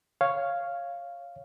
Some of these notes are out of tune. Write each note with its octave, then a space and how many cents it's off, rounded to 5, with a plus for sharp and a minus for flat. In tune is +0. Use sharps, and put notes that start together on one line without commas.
C#5 +0 F5 -5